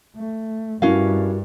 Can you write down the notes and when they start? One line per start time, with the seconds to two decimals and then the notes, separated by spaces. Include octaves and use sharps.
0.17 A3
0.82 G2 C#4 E4 F#4 A#4 F5